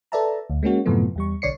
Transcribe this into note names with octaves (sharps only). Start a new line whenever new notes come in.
A4 B4 D5 E5 A5 A#5
D2
G#3 A#3 C#4 F#4
F#2 A2 C3 F3 A3 B3
E2 G3 C#6
B1 D3 C#5 D5 C7 C#7